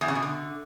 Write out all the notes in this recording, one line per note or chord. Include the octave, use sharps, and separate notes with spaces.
E2
C#3
B2
D3